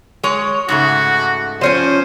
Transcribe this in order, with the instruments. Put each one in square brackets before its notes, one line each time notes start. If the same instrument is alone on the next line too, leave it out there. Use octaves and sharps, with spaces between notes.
[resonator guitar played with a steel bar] G#3 C#5
[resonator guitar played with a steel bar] G#2 C#3 A3 [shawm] F#4
[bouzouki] F3 C#4 G#5 [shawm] C5